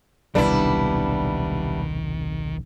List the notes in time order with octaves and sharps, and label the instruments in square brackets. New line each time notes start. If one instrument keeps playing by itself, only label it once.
[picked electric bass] D#1 B1 C3 [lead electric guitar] D#3 [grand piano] G3 B3 [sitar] D4 E4